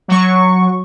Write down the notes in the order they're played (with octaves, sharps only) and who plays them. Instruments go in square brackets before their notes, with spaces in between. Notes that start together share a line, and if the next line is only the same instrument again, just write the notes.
[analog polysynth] F#3 C#6